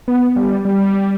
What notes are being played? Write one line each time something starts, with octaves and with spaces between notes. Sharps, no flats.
B3
G3
G3